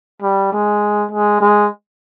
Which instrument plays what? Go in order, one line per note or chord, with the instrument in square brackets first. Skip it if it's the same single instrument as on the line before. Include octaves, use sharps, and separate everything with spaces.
[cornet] G3
G#3
G#3
G#3